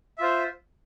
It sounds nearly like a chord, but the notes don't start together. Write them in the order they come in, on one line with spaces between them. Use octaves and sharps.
E5 F4 C5